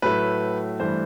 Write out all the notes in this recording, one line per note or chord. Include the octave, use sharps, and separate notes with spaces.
A2 F#3 A3 B4
G2 E3 A3 C5